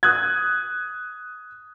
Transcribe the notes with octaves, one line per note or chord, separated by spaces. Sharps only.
D#6 F#6 G#6